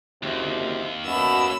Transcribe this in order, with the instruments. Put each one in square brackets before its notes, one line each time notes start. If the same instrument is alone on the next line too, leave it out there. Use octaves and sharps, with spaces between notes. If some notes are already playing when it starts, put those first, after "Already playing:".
[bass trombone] F#1 [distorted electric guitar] D#2 [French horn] C3
[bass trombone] F#2 [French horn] B2 [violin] B5 E6